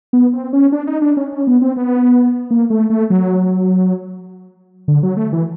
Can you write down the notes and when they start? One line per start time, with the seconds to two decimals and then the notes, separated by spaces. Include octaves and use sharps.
0.13 B3
0.33 C4
0.53 C#4
0.72 D4
0.87 D#4
1.02 D4
1.17 C#4
1.33 C#4
1.47 B3
1.62 C4
1.76 B3
2.51 A#3
2.70 A3
2.90 A3
3.10 F#3
4.88 D3
5.03 F#3
5.17 A3
5.33 E3